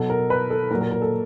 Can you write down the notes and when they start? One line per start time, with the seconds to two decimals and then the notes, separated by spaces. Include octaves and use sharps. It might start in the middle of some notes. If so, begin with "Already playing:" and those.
Already playing: B2 F#3 A4
0.10 A#4
0.30 B4
0.50 A4
0.71 A#2 F#3 A#4
0.81 A#4
0.91 A#4
1.02 A4